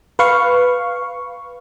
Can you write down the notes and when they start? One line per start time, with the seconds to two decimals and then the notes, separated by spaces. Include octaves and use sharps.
0.19 B4 F5 C#6